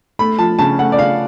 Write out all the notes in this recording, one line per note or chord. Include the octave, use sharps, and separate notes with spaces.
A3 B5
F3 A5
C#3 A5
A3 F#5
D5
C#3 F5